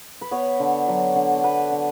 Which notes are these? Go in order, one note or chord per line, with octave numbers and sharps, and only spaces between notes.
B4
B3 C#5
D3
F#3
D3
A4
B3 B4
D3